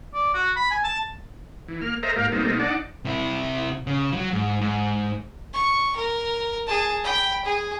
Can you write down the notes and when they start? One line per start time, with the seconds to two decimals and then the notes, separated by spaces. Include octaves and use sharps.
0.14 D5
0.34 F#4
0.56 B5
0.71 G#5
0.84 A5
1.68 E3
1.82 A#3 F6
2.03 A4 A#4 C5 D#5 E5 A#5
2.16 G#2 A#3 G4 A#4 F5
2.32 B2 G3 A3 A#3 C4 D#4
2.59 D4 D#4 D5 F#5 A5
3.05 C3 E4
3.87 C#3
4.13 F3 F#3
4.33 G#2
4.61 G#2
5.53 C#6
5.96 A#4
6.67 G#4 A5
7.04 G5 B5
7.45 G#4